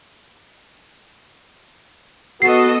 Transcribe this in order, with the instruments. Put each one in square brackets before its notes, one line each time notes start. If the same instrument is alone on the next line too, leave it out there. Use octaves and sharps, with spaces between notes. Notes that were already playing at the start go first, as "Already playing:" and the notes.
[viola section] B3 A4 D#5 [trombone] F#4 [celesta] C7